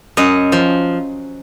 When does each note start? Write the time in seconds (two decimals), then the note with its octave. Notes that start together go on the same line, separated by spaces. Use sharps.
0.17 F#2 D#5
0.52 F3